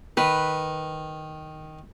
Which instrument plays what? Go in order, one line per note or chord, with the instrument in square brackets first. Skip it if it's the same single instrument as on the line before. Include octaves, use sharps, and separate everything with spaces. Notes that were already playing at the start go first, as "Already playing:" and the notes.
[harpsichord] D#3 [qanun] B4